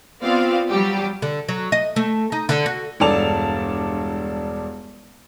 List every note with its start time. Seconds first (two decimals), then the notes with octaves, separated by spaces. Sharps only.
0.22 B3 C4 F4 D5 F5
0.70 F#3 G3 G4
1.22 D3
1.48 F#3
1.72 D#5
1.96 A3
2.32 D#4
2.49 D3
2.66 F#4
3.00 E1 G2 A4 D5 A5 F7